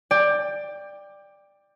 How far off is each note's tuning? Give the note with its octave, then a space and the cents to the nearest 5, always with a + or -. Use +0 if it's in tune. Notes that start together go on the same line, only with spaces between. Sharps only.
D5 +10 G5 +20